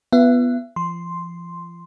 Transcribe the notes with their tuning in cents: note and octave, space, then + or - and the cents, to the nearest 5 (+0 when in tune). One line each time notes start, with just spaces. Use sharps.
B3 +0 F4 -35 E5 +35
F3 -35 C6 +0